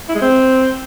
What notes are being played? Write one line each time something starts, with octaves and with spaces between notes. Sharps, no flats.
E4
G#3
C4